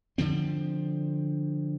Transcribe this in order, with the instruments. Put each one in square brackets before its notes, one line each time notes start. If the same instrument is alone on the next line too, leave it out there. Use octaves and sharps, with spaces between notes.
[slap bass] D3 F3 C4